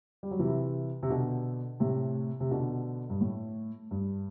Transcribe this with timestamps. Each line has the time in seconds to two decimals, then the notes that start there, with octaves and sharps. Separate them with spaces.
0.23 G3
0.31 F#3
0.39 C3 E3
1.03 C3
1.10 B2 D3
1.80 A2 C3
2.40 C3
2.51 B2 D3
3.10 G2
3.21 A2
3.91 G2